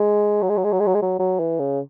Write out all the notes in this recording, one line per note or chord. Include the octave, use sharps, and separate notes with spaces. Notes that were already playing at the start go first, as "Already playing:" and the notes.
Already playing: G#3
F#3
G#3
F#3
G#3
F#3
G#3
F#3
G#3
F#3
F#3
E3
C#3